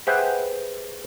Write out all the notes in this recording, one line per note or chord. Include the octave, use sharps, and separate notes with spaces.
G4 G#4 B4 C5 E5 F#5